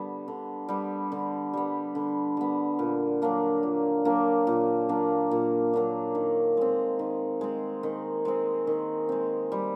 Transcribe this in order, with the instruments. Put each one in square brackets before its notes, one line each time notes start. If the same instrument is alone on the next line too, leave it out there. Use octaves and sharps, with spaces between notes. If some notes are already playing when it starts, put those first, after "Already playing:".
Already playing: [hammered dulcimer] D3 G3 B3
D3
G3 B3
D3
G3 B3
D3
G3 B3
A#2
F#3 A#3 D4
A#2
F#3 A#3 D4
A#2
F#3 A#3 D4
A#2
F#3 A#3 D4
D#3
G#3 C4
D#3
G#3 C4
D#3
G#3 C4
D#3
G#3 C4
G3